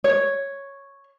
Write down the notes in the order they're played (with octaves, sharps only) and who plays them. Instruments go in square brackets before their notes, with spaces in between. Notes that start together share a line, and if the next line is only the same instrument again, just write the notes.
[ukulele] C#5